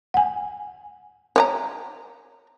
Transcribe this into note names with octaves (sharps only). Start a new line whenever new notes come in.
F#5 G#5
C#5 D5 A#5